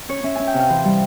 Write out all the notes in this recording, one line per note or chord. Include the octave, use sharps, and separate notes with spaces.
C#4 C#5
C#4 E5
C#4 G#5
G5
C3 F5
E3 C5
G3